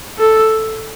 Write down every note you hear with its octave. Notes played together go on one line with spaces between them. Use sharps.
A4